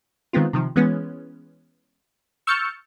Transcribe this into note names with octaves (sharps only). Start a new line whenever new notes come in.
D#3 G#3 B3 C4 F4
C3 D#3 F3
E3 G#3 B3 C#4
C#6 E6 F6 G6 A6 C#7